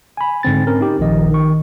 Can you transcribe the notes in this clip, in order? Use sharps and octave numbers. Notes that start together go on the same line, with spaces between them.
G#5 B5
G#2 D3 C4 A6
C4 C#4 A#4
D#4 G4
A#1 A#2 D#3 F3 D#5
D#3 C#6